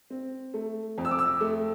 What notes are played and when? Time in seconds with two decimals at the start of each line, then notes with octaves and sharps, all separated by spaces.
0.10 C4
0.54 A3
0.98 F2
1.05 E6
1.11 D6
1.19 E6
1.41 A3